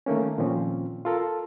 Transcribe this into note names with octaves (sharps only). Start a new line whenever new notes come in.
D#3 A3 A#3 C#4
A#2 D#3 F3 C4 C#4
F4 A4 A#4